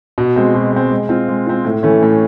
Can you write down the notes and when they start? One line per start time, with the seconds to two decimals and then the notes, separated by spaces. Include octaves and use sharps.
0.18 B2
0.36 G#3 C4
0.54 B2
0.72 G#3 C4
0.91 G#3
1.09 C4 F4
1.29 G#3
1.46 C4 F4
1.65 A2
1.83 E3 A3 C#4
2.02 A2